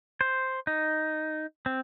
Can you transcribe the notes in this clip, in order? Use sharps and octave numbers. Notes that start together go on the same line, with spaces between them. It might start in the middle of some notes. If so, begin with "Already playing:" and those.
C5
D#4
C4